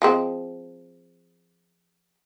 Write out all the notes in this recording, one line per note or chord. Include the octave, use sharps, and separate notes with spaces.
F3 G#3 C4